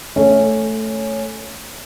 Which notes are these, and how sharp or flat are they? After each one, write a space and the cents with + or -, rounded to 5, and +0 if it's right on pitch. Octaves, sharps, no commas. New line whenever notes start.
A3 +0 C#4 +0